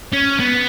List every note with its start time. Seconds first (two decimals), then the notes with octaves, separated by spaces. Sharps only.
0.13 C#4
0.39 B3